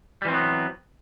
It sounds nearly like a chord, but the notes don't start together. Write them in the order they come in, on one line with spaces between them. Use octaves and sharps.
G3 E3 C4 F#3 B3